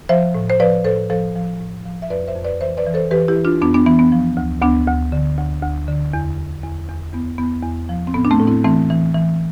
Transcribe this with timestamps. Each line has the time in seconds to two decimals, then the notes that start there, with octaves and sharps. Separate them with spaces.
0.09 F3 C5 E5
0.35 A2
0.50 C5
0.60 F3 B4 D5
0.85 A2 A4 C5
1.10 F3 A4 C5
1.35 F3
1.61 A2
1.85 F3
2.02 E5
2.10 F2 B4 D5
2.28 C5 E5
2.35 F2
2.45 B4 D5
2.61 E3 C5 E5
2.77 B4 D5
2.86 E3
2.94 A4 C5
3.11 E3 G4 B4
3.28 E4 G4
3.36 E3
3.45 D4 F4
3.62 F2 B3 D4
3.74 B3 D4
3.86 E3 B3
3.99 B3
4.12 F3
4.37 D2
4.62 D2 B3 D4
4.87 D2
5.12 D3
5.38 D2
5.63 D2
5.88 D3
6.13 E2
6.38 E2
6.64 E2
6.88 E2
7.13 E2 B3
7.38 E2 B3
7.63 E2
7.89 F3
8.07 C4
8.14 A2 B3
8.25 D4
8.31 A3 C4
8.40 A2
8.47 C4 E4
8.64 E3 A3 C4
8.90 E3
9.15 E3